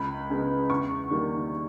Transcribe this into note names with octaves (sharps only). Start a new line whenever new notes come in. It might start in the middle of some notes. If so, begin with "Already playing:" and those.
Already playing: C#2 B5
C#3 G#3 B3
E2 C#6
D#3 G3 A#3